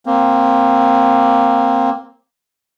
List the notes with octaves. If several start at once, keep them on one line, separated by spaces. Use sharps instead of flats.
A#3 C4